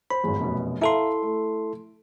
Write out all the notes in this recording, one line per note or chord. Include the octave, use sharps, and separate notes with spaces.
C5 B5
G#1 E2
F1 F#2 B2
E4 A4 E5 F5 A#5 C6
A3